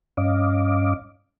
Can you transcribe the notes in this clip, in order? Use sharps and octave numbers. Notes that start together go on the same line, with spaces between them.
G2 C#4 D#5 F5 D6